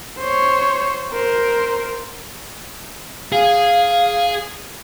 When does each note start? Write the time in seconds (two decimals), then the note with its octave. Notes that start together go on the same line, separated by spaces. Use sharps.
0.18 C5 C#5
1.13 A#4 C5
3.32 G#4 F5